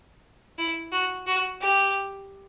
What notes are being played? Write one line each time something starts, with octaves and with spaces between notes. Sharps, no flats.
E4
F#4
F#4
G4